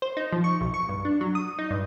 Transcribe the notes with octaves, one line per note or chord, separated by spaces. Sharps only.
C5
D#4
F3
C#6
B1
C#6
G2
D4
F#3
D#6
D#4
G2